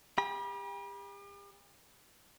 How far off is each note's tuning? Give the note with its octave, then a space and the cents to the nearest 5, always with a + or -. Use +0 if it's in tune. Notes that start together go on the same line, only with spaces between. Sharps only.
G4 +40 B5 -35